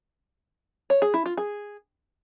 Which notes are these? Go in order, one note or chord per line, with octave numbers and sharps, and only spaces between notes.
C#5
G#4
E4
F4
G#4